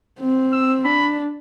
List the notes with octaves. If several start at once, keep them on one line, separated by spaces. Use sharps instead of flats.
C4
E6
D4 B5